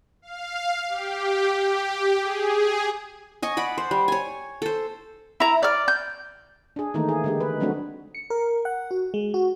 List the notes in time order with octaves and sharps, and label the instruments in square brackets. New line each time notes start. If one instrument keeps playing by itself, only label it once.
[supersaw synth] F5
G4
G4
G#4
[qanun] D#5 G#5 C#6
D5 F#5 B5
C5
G3
C#5 G#5
A4 C5
[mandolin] E4 A#5
D5 F6
G6
[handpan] D4 G#4
D#3 E3 A3 A#3 D#4
G#4
D3 G#3 G4
B4
F#3 G3 A3 C4 D4 F#4
[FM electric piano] C#7
A#4
F#5
F#4
G#3
F#4